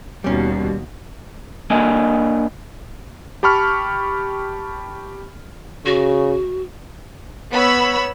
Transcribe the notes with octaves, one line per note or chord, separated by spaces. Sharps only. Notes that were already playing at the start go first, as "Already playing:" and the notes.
D#2 B2 G3 C#4
A#3 D4 D#5 G#5
G4 A5 B5 C#6 F6
C#3 F#4
B3 C#5 B5 E6